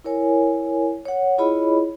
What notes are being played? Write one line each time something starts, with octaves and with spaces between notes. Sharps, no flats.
E4 A#4 C#5 G#5
C#5 F#5
E4 F4 G#4 C#5 D#5 B5